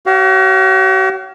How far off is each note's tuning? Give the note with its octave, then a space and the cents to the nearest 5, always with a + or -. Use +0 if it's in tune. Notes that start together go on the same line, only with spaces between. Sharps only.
F#4 +45 C#5 +0 F5 +0